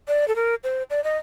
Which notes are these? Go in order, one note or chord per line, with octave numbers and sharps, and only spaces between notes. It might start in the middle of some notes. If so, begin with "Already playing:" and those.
D5
A4
A#4
C5
D5
D#5